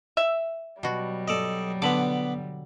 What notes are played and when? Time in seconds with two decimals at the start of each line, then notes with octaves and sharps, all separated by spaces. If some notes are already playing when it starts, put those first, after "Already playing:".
0.17 E5
0.83 B2 F#3 G3 F#4
1.28 A4 D5 D#5
1.82 D3 B3 B5 D6